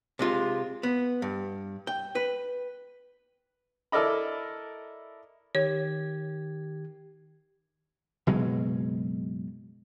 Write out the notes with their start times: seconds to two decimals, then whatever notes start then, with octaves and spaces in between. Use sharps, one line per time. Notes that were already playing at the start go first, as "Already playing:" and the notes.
0.19 C3 G#3 F4
0.83 B3
1.22 G2
1.87 G5
2.15 B4
3.92 E4 A4 A#4 D5 D#5 B5
5.55 D#3 G4 C#5 G#6
8.27 F#1 B2 F#3 G#3